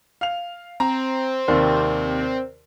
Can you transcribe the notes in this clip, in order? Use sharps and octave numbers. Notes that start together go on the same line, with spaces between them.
F5 F7
C4 A#5
D#2 C3 A#4 D5 C6